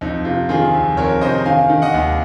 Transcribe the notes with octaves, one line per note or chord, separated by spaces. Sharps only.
F2 D#4
C3 F4
D#3 F4 G#4
F2
F2 A#4 C#5
C3 C5 D#5
D#3 F5 G#5
D#3
D#5 F#5
D#2